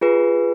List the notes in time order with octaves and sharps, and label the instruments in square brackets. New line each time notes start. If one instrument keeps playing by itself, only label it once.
[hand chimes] F4 G#4 B4